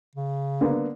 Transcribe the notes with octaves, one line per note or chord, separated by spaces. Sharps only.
C#3
D3 A#3 B3